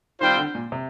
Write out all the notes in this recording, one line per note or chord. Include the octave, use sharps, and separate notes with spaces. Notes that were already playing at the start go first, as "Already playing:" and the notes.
D#3 G3 C4 F4 C5 G5
D3
A#2
C3